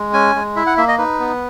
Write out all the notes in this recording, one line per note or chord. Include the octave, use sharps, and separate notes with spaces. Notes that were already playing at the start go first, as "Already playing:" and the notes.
Already playing: G#3
C#4 G#5
G#3
E4 E5
F#5
A#3 E5
D#5
D#4 B4
B3